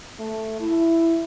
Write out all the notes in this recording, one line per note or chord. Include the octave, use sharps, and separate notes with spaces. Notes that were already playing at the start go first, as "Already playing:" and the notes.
A3
E4